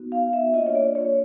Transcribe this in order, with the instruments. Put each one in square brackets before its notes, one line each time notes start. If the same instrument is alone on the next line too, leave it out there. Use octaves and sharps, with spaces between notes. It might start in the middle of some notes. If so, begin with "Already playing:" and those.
Already playing: [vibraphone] B3 D#4 F#4
F5
E5
A#3 D4 F4 D#5
C#5
D5
C#5